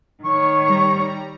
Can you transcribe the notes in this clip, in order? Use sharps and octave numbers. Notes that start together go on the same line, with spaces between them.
D#3 C#5 C#6
G3 A#5